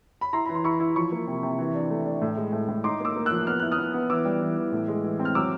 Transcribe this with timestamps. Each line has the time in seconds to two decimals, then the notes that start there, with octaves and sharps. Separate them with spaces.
0.21 B5
0.33 E4 A#5 C6
0.46 E3 B5
0.55 C6
0.64 E4 B5 C#6
0.80 E4
0.96 F3 B5 C#6
1.12 A#3
1.27 C3
1.43 C3
1.59 E3
1.75 D4
1.90 A3
2.06 D4
2.22 A2
2.37 G#3
2.53 A2
2.69 A2
2.84 D#4 C6 D6
3.00 A#3 D6 E6
3.16 A#3
3.26 F3 E6 F#6
3.47 B3 F6
3.60 E4 F#6
3.71 D#6 F6
3.78 B3
3.94 B3
4.10 E3 D6 E6
4.25 G3
4.41 E3
4.57 E3
4.72 A2
4.88 G#3
5.04 E3
5.19 C4
5.25 F6
5.35 F#3 D6 E6